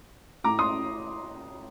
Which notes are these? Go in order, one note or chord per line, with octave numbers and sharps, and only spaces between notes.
A2 A#5 D6
C6 D#6